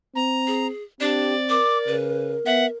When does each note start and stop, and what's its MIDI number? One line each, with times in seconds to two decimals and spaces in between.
0.15 0.69 60
0.15 0.67 82
0.47 0.83 68
1.00 1.60 60
1.00 1.32 62
1.00 1.35 67
1.00 1.96 74
1.49 2.77 70
1.49 1.78 86
1.87 2.36 49
1.87 2.32 71
2.46 2.66 59
2.46 2.66 76
2.46 2.66 78